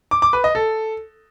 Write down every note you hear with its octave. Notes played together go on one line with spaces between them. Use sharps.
D6
D6
B4
D#5
A4